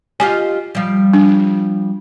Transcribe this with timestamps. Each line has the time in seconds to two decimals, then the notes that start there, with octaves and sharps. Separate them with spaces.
0.20 F4 G4 D#5 G#5
0.75 F3 G3
1.13 D4